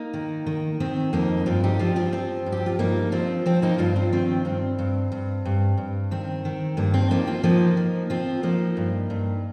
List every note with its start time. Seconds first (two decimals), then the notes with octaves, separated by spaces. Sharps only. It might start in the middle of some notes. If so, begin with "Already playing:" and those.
Already playing: A#3 D#4
0.14 D#3
0.46 D#3
0.80 D#3 C4
1.13 F2 A#3 D#4
1.46 G2 C4 F4
1.64 D#4 G4
1.79 F3 C4 F4
1.96 C4 F4
2.12 F3 C4
2.46 G2
2.52 G4
2.66 F4
2.79 G2 A#3 D#4
3.12 F3 C4 F4
3.46 F3 C4
3.62 A#3 D#4
3.78 G2 C4 F4
3.96 C4 F4
4.13 D#3 C4 F4
4.45 G2 C4
4.79 G2
5.12 G2
5.45 G2
5.77 G2
6.11 D#3 C4
6.45 D#3
6.77 G2 A#3
6.94 C4
7.11 F3 A#3 D#4
7.27 C4 F4
7.44 F3 A#3 D#4
7.77 F3
8.10 F3 C4 F4
8.43 F3 A#3 D#4
8.77 G2
9.10 G2